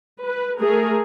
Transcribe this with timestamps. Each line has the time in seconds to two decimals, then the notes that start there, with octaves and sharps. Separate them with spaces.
0.24 B4
0.61 A3 G#4 A#4